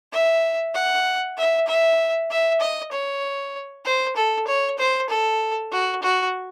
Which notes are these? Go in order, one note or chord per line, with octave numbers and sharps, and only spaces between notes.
E5
F#5
E5
E5
E5
D#5
C#5
C5
A4
C#5
C5
A4
F#4
F#4